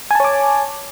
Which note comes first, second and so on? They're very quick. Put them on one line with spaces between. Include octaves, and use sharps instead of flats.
G#5 A5 C#5 D6